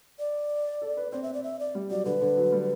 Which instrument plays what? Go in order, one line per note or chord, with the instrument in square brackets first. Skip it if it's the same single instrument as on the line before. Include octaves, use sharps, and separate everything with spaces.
[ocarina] D5
[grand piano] A4
B4
[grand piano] C4 [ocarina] D5
[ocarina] E5
D5
E5
D5
[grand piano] G3
[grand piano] F#3 [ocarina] D5
[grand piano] D3 [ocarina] B4
[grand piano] D3
F#3
G3